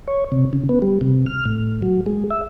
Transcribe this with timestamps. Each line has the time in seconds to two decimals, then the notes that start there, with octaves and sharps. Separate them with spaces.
0.08 C#5
0.32 C3
0.53 C#3
0.69 B3
0.82 G3
1.01 C3
1.26 F6
1.45 A2
1.82 F#3
2.06 G#3
2.31 E5